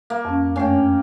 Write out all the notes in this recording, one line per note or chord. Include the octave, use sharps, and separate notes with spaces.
A#3
F2 C#4
F#2 A3 C#4 D4 G5